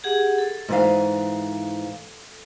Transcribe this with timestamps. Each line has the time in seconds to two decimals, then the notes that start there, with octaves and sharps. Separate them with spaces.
0.04 G4 G#4 F#5
0.38 A4
0.68 G#2 E3 F5